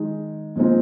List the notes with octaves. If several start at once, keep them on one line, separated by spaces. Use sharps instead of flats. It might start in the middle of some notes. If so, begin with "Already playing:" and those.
Already playing: D#3 G#3 D#4
A#2 F3 G#3 C4 D#4